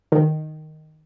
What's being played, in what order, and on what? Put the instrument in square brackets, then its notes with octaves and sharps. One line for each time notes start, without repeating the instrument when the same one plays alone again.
[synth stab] D#3